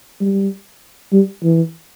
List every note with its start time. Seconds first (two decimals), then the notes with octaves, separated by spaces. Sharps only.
0.21 G3
1.13 G3
1.43 E3